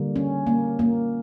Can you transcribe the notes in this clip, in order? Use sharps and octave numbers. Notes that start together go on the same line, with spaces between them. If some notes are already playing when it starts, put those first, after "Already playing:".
Already playing: D3 G3 A#3
C#4
A#3
A#3